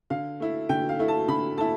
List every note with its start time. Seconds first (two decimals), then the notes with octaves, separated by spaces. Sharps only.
0.10 D3 F5
0.40 A3 E4
0.69 D3 G5
0.89 F5
0.99 A3 E4
1.08 A5
1.28 D3 B5
1.57 A3 E4 A5